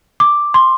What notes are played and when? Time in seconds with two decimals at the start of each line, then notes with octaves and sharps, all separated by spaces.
0.20 D6
0.54 C6